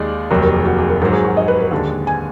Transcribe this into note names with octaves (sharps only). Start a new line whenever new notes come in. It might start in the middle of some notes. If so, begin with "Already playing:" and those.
Already playing: D#2 D#3 G#3 D#4 D5
F1 D#2 D#3 F#3 A#4
A#4
G#4
F#4
G#4
A#4
G#2 D#3 F#3 A#4
G#4
F#4
D#5
B4
A#4
D#2 D3 G#3 D4
G#5